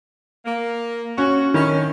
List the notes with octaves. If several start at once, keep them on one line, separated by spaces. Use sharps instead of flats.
A#3
C#4 F#4
D#3 C#4 E4